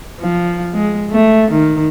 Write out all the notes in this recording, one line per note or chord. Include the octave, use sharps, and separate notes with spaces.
F3
G#3
A3
D#3